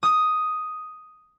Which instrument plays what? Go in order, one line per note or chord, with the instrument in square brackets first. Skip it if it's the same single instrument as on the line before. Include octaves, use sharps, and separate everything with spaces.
[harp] D#6